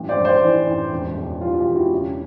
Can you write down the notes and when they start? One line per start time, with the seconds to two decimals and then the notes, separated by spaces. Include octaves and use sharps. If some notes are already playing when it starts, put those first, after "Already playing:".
Already playing: A1 G2
0.09 C5 D5
0.17 G2
0.25 C5 D5
0.43 E3
0.66 A1
0.92 E1
1.17 E1
1.41 E2 F4 G4
1.59 F4 G4
1.68 E1
1.75 E4 F#4
1.92 C#3